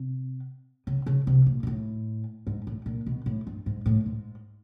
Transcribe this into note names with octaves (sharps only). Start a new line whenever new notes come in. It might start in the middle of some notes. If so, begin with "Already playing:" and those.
Already playing: C3
C#3
C#3
C3
A#2
A#2
A2
G#2
A2
A#2
B2
A2
G2
G#2
A2
G#2